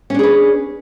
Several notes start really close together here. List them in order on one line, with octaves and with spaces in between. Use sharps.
C#4 D4 G#4 B4